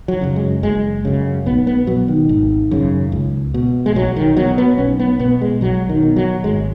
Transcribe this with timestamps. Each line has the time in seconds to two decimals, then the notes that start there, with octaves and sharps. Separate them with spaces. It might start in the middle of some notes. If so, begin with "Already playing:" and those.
0.08 F#3
0.21 F#2 C#3
0.36 G#3
0.63 F#1 G#3
1.05 F#2 C#3
1.46 B1 B3
1.67 B3
1.87 B2 F#3
2.08 D#3
2.29 G#1
2.71 F#2 C#3
3.12 C#2
3.54 B2
3.86 G#3
3.95 B1 F#3
4.16 D#3
4.37 B2 F#3
4.58 B3
4.78 B1 C#4
4.99 B3
5.19 B2 B3
5.41 G#3
5.61 B1 F#3
5.89 D#3
6.03 B2
6.16 F#3
6.44 G#1 G#3